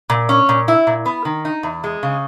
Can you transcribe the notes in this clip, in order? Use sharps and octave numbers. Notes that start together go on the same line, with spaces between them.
A#2
C#4
A#2
E4
A#2
B3
D#3
D#4
E2
G#3
C#3